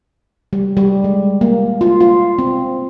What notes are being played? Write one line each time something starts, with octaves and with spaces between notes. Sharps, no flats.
G3
G3
G#3
A#3
F4
F4
C4